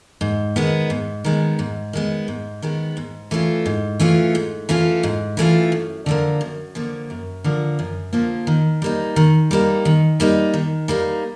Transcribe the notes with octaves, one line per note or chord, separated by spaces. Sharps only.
G#2
D#3 G#3 B3
G#2
D#3 G#3 B3
G#2
D#3 G#3 B3
G#2
D#3 G#3 B3
G#2
E3 A3 C#4 F4
G#2
E3 A3 C#4 F4
G#2
E3 A3 C#4 F4
G#2
E3 A3 C#4 F4
F#2
D3 F3 A#3
F#2
D3 F3 A#3
F#2
D3 F3 A#3
F#2
D3 F3 A#3
D#3
G3 A#3 D#4
D#3
G3 A#3 D#4
D#3
G3 A#3 D#4
D#3
G3 A#3 D#4